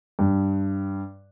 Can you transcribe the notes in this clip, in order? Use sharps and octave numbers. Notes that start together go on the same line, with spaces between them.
G2